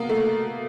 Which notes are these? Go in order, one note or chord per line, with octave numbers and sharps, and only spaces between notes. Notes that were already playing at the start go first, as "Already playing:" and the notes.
Already playing: A#3 B3
A3